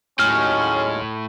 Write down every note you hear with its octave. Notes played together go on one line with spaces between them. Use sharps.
D#2 A2 F#3 G#3 C#4 F6